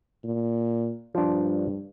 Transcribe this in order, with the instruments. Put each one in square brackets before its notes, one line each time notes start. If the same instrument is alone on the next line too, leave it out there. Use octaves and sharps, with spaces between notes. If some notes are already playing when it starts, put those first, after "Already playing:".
[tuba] A#2
[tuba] G2 [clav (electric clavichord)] F3 D4